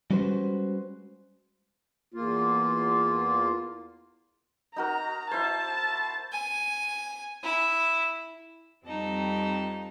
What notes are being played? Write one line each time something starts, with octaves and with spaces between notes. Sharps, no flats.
G3 G#3 C#4 F#4 B4 C5
E2 A#3 F4
D#4 F#4 A#4 A#5
E4 C5 A5
G#5
E4
F2 G3 C4 D#4 A5